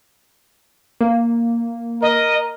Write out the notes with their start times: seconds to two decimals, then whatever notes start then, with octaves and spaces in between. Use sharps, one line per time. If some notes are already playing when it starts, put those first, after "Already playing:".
1.01 A#3
2.02 A#4 D#5